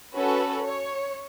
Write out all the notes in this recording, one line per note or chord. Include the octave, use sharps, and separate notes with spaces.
C#4 F#4 A4 B4
C#5